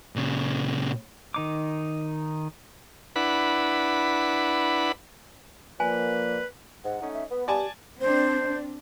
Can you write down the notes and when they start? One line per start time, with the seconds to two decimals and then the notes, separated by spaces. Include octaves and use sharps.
0.16 A#2 C#3
1.34 D#3 D#4 D6
3.16 D4 E4 B4 F#5 B5
5.80 F3 A#3 B4 D5 G#5
6.84 G#2 F#5
7.02 A3 C#4 D#4
7.14 E5
7.31 B3 B4
7.48 G4 D5 G#5 A5
8.01 C4 D4 C5